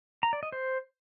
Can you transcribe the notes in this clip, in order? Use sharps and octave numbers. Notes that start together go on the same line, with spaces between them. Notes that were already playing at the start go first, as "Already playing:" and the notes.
A#5
D5
D#5
C5